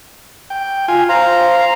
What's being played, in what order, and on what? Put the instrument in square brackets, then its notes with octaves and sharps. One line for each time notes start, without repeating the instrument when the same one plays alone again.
[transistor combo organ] G5
F4 G#5
[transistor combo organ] C5 [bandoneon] F5 A#5